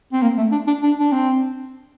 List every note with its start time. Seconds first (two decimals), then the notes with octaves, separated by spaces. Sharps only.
0.13 C4
0.22 A#3
0.38 A3
0.52 D4
0.67 D4
0.82 D4
0.99 D4
1.12 C4